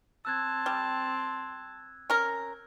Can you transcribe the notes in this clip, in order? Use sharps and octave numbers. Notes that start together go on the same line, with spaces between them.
C4 A5 E6 F#6 G#6
G3
C#4 A#4